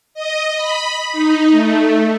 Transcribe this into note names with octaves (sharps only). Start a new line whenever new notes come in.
D#5
B5
D#4
A3